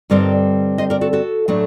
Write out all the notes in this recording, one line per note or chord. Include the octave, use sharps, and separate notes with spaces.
G2 D3 G3 C4 D#4 A#4 D5
C5 D#5
A#4 D5
F#4 A4
F#4 A4
A2 F#3 A3 D4